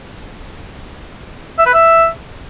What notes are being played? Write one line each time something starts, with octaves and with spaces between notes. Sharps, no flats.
E5
B4
E5